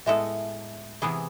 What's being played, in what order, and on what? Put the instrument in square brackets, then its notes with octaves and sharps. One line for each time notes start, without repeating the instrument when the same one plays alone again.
[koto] A2 G#3 B3 E4 A4 [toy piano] E5
[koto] C3 E3 B3 E4 G#4